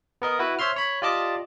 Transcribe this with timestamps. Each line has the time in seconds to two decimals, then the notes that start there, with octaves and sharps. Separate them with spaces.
0.22 B3 A#4 D#5
0.39 E4 F#4 B4
0.59 C5 C#5 E5 C6 F6
0.76 C#5 B5
1.02 F4 G4 D5 D#5 A5 D6